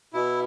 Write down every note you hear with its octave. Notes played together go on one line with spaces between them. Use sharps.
B2 E4